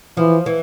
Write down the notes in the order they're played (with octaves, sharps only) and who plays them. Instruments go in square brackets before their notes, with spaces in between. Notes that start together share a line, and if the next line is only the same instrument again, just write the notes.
[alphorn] E3 [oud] F3
[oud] E3